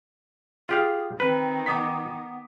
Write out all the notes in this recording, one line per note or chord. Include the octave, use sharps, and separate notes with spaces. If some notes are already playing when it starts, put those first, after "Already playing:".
F4 G4 G#4 F5
D#3 C4 B4
B3 D6 D#6 B6